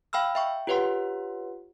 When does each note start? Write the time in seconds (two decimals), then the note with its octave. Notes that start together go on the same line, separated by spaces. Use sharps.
0.13 F5 G5 B5 E6 F6
0.35 E5 G5 C#6
0.67 F4 G4 B4 C#5 F#5 C6